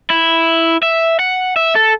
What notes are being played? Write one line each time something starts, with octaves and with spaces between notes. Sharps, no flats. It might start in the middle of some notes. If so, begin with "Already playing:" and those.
E4
E5
F#5
E5
A4